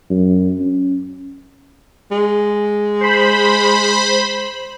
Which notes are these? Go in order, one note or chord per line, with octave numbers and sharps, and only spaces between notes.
F#2
C#4
G#3
C5 B5